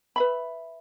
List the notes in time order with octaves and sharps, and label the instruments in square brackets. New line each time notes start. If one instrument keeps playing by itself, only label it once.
[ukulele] B4 E5 B5